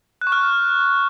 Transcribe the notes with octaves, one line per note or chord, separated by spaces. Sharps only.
F#6
C#6
F6